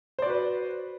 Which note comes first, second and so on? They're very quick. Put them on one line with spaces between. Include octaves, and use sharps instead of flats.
C5 D5 F#4 B4